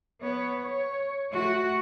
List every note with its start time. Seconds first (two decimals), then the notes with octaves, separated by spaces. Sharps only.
0.21 B3 C#5
0.63 C#5
1.32 A3 F#4